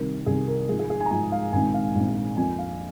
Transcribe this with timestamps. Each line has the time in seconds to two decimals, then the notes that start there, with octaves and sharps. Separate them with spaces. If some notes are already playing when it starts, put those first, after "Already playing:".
Already playing: C2 C3 D#3 A#4
0.26 C2 C3 D#3 G#4
0.48 A#4
0.69 G#2 F3 G#3 G#4
0.79 G#4
0.90 G#4
1.00 G#5
1.06 A#5
1.11 G#2 F3 G#3 G#5
1.32 F5
1.53 A#1 G#2 D#3 G#3 C4 G#5
1.74 F5
1.95 A#1 G#2 D#3 G#3 C4
2.37 F2 F3 A#3 G#5
2.58 F5